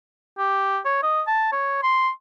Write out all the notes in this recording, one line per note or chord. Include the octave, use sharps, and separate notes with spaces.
G4
C#5
D#5
A5
C#5
C6